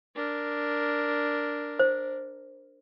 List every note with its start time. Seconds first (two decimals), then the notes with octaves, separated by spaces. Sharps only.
0.16 D4 A#4
1.79 C5